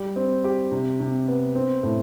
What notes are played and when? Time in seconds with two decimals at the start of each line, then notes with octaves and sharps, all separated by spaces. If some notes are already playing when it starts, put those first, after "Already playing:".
Already playing: G3 G4
0.16 C4
0.44 G4
0.72 C3
1.00 C3
1.28 B3
1.55 C4
1.83 A2